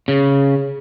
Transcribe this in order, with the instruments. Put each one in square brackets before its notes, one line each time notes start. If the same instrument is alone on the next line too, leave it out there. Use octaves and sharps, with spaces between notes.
[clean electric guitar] C#3